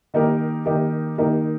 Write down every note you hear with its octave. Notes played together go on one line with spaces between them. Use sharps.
D#3 A#3 D#4 G4 A#4
D#3 A#3 D#4 G4 A#4
D#3 A#3 D#4 G4 A#4